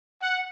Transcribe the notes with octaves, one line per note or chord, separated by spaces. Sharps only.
F#5